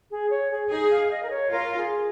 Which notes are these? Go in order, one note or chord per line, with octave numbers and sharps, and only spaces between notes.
G#4
C#5
G#4
D#4 G#4
F5
D#5
A#4
C#5
F4 A#4
G#4